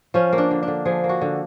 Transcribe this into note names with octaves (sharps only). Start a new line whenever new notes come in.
F3 C#4
A#3
D4
D3
D3 D4
F3 G#4
A#3
F#4
D3